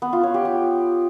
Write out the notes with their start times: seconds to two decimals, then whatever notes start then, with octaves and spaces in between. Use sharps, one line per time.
0.02 B3
0.13 F4
0.23 C#5
0.34 G4
0.45 G4